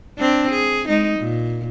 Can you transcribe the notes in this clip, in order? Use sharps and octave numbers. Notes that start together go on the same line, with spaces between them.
C4 D4
G#4
G#3 D#4
A#2